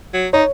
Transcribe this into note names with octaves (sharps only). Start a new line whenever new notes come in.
F#3
D#4 C#5